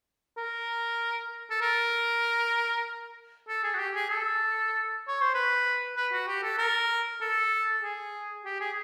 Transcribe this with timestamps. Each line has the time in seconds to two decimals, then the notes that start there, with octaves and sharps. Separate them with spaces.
0.38 A#4
1.51 A4
1.62 A#4
3.49 A4
3.64 G#4
3.74 F#4
3.79 G4
3.95 G#4
4.10 A4
5.08 C#5
5.21 C5
5.34 B4
5.97 B4
6.12 F#4
6.28 G4
6.43 A4
6.58 A#4
7.21 A4
7.83 G#4
8.45 G4
8.60 G#4